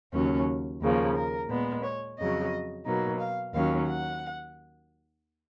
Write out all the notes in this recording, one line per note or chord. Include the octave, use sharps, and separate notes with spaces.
D#2 C#3 F#3 C#4
D#2 C#3 F3 A#3
A#4
A#2 G#3 B3
C#5
F2 C#3 F#3 D#5
B2 F#3 A#3 D#4
F5
D#2 D#3 F#3 C#4 F5
F#5